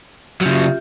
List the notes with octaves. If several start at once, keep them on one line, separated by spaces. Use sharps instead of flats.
C#3 F#3 F4 G4 E5